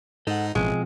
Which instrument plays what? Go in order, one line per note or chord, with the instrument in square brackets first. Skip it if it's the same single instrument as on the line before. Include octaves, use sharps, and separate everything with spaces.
[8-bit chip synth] G#2 D#4 [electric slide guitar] A4 F#5
[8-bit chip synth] A1 [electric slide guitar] B2 F3 C4 [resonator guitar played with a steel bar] G#3